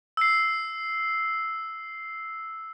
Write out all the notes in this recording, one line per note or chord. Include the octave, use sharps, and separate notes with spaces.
E6 C7